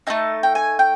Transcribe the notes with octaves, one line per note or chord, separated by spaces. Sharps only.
A3 C4 D#4 A5
G5
G#5
G5